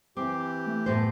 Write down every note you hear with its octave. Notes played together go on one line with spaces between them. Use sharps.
E3 C4 G4 D6
A3
A2 B3 C5